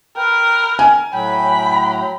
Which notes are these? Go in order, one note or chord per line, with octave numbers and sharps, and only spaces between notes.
A#4 B4 G5
G#5
A2 F#3 G5 B5